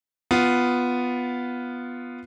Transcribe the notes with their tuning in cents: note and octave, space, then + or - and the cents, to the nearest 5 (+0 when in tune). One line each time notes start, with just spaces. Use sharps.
B3 +0 F4 +0